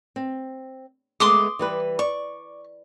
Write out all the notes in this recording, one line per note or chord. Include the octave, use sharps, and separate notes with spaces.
C4
G#3 A3 B3 C6 D6 D#6
E3 G3 B4
D5 C#6